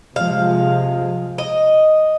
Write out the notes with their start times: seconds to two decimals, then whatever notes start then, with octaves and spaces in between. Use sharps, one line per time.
0.16 C3 F3 G#3 F5
1.38 D#5